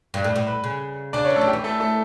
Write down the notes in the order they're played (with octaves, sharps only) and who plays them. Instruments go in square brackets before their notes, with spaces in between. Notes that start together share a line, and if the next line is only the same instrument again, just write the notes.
[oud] G2
A2
A2
[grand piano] B4 B5
[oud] C#3
[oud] C#3 [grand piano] D4 D5
[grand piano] C#4 C#5
[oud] E3
[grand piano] A3 A4
[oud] F#3
[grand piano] G4
[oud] E3
[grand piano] A3 A4
A3 A4